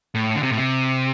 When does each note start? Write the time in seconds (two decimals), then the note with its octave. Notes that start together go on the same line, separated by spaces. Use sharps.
0.15 A2
0.35 D3
0.43 C3
0.50 A2
0.57 C3